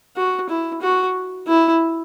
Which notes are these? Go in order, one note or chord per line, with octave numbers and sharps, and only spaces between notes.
F#4
E4
F#4
E4